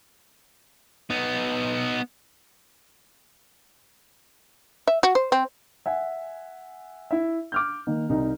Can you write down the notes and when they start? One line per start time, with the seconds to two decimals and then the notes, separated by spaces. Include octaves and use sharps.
1.10 B3 D#4
4.87 E5
5.03 F#4
5.15 C5
5.32 C4
5.86 E5 F#5 G#5
7.11 E4 E5
7.52 D6 F6 G6
7.87 D#3 A#3
8.09 C2 D#4